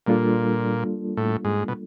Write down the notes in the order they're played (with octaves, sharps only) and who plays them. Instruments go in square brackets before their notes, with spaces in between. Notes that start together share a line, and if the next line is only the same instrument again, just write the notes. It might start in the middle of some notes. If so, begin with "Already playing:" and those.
[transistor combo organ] A#2 [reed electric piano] G3 A#3 D4 F4 A4
[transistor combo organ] A2
G#2
B2